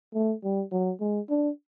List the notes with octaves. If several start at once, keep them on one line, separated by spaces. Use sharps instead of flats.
A3
G3
F#3
G#3
D4